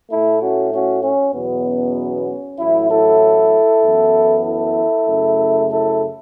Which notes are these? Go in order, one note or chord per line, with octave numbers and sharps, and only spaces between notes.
A2 A3 E4 A4
C#4 F#4
C#4 F#4
C#4
E2 B2 F#3 B3
C#4
A1 A2 F#3 E4
E4 A4
F#2 E3 B3
E4 A4
F#2 C#3 A3
E4 A4